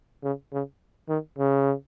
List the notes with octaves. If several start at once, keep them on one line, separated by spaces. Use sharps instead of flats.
C#3
C#3
D#3
C#3